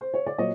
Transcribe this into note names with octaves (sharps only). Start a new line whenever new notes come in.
C5
C#5
D5
A#2 F#3 C#5 D#5